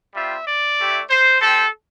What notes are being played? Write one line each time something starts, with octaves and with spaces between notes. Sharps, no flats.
G3 C4 F4 E5
D5
A3 E4 G4
C5
C4 G4 A4